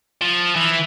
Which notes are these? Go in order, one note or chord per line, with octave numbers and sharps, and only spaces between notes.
F3
E3